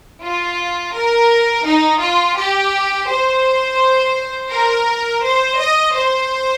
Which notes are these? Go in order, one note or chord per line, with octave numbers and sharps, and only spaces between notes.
F4
A#4
D#4
F4
G4
C5
A#4
C5
D#5
C5